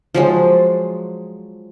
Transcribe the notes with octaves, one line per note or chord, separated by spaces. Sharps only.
F3 F#3 G#3